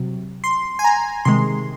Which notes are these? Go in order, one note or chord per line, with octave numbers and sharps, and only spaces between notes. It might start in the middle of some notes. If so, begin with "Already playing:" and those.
Already playing: C3 F#3
C6
G#5
A#5
C3 D#3 G#3 C6